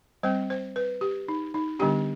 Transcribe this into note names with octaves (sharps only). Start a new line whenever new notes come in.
G3 C4 C5
C5
B4
G4
D#4
D#4
D3 G3 B3 D4 G4